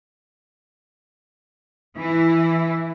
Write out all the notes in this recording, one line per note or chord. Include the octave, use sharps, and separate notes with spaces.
E3 E4